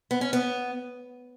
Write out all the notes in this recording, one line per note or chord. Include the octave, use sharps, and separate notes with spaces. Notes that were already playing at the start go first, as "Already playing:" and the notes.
B3
C#4
B3